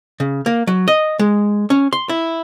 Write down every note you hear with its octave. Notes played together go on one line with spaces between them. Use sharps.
C#3
A#3
F#3
D#5
G#3
C#4
C6
E4